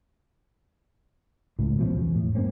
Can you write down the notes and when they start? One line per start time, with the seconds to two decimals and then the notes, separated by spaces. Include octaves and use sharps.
1.59 C#2 A2
1.79 B2 F3 C#4
1.97 E2
2.15 A2
2.35 G2 A#3 C4 C#4